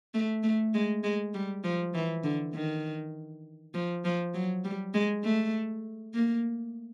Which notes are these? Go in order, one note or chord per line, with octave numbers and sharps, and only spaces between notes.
A3
A3
G#3
G#3
G3
F3
E3
D3
D#3
F3
F3
F#3
G3
G#3
A3
A#3